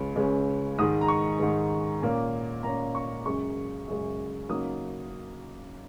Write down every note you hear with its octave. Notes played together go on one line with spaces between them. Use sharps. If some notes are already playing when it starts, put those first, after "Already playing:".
Already playing: C#2 G#3 C#4
C#2 C#3 G#3 C#4
G#2 D#3 G#3 D#6
A#5
C#6
G#2 D#3 G#3
A#2 A#3 C#4
A#2 A#3 C#4 A#5
C#6
F#2 C#3 G#3 C#6
F#2 C#3 G#3
C#3 F#3 A#3 D#4 D#6